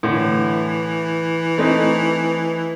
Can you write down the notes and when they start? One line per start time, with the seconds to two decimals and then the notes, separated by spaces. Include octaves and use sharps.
0.03 A2 D3 E3
1.58 A3 C4 D#4